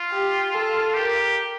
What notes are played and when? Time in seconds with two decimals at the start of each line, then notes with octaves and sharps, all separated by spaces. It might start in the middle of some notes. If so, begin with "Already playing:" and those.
Already playing: F4
0.12 G4
0.53 A4
0.94 G4 A#4